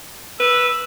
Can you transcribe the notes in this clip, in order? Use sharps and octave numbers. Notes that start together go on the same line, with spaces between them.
B4 E6